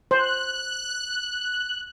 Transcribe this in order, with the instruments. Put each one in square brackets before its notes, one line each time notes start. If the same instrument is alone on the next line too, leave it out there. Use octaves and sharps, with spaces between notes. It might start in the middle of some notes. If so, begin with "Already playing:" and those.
[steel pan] C5 [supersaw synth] F#6